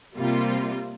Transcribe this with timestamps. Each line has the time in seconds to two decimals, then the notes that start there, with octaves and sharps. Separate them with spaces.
0.16 C3 G3 A#3 F4